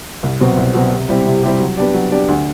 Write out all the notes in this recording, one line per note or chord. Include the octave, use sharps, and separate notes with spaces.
C2
B2 F#3 C4
C2
B2 F#3 C4
C3
G3 C4 E4 G4
C3
G3 C4 E4 G4
F#3
B3 D4 G4 D5
F#3
B3 D4 G4 D5
D2